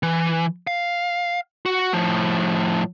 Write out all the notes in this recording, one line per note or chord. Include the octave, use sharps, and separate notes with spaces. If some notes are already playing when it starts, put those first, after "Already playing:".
E3
F5
F#4
A2 F3